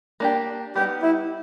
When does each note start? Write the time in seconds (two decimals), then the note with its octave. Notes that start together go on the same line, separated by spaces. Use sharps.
0.20 A#3 D4 G4
0.75 G3 B3 D#4 G4
1.02 E4